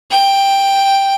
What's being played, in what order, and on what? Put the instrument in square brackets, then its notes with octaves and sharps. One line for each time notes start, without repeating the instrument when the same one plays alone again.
[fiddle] G5